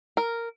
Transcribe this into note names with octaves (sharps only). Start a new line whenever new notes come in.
A#4